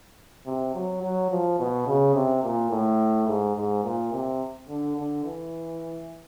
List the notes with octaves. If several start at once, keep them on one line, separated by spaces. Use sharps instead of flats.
C3
F#3
F#3
F3
B2
C#3
C3
A#2
A2
G#2
G#2
A#2
C3
D3
D3
E3